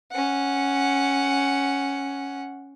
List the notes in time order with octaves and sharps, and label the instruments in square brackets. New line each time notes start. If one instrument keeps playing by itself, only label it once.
[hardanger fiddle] C#4 F#5